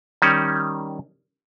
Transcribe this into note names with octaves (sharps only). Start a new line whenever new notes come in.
D#3 G3 C#4